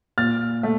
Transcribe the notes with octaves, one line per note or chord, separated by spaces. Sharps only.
A#2 F6 A6
A3